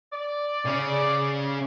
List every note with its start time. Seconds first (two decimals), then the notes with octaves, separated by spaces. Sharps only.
0.13 D5
0.65 C#3 C#4